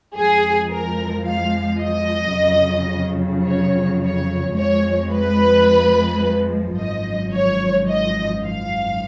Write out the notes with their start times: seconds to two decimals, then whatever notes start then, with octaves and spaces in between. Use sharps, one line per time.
0.15 F2 F3 G#3 G#4
0.71 A#4
1.26 F5
1.81 D#5
2.36 F2 C#3 F#3
3.47 C#5
4.02 C#5
4.57 F2 F3 G#3 C#5
5.12 B4
6.77 G#1 F#2 F3 D#5
7.33 C#5
7.88 D#5
8.43 F5